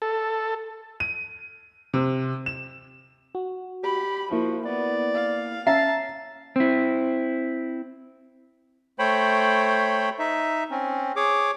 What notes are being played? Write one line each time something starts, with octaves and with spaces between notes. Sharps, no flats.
A4
D#7
C3
E7
F#4
G4 B5
F3 A#3 E4 F#4
B3 D5
F5
C#4 E5 A5 A#5 C7
C4 E4
A3 C5 C#5 G5 B5
D#4 E5
C4 C#4
G#4 C#5 D6